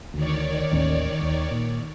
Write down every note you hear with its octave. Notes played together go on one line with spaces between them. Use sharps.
D2 D#3 C#5 D5
A1 D#2 C#4
D1 D#2
A#2